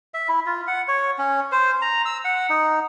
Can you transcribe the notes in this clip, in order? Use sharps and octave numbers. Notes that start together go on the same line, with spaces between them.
E5
E4
F4
F#5
C#5
C#4
C5
A#5
E6
F#5
D#4